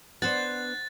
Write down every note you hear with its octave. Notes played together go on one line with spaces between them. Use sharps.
B3 D4 C5 F#5 F#6 A6